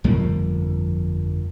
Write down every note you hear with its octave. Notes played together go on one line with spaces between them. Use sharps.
G1 F2 F3 A#3